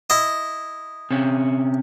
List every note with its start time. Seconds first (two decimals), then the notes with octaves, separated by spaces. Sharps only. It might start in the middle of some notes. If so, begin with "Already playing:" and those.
0.10 E4 D#5
1.11 C3 C#4